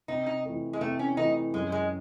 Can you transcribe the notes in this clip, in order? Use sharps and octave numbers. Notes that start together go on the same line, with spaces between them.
C3 D#4
D#4
E3 A3
G#3
C3 A3
C#4
E3 A3 D#4
F#2 G#3
G#3